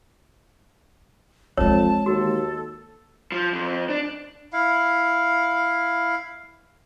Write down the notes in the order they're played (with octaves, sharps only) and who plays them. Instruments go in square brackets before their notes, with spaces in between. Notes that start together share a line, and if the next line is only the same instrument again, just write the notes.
[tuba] F2 [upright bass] E3 G#3 [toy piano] C#5 [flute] A5
[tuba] D#2 [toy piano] F#4 [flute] A4
[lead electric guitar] F3
F2
D4
[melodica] E4 F5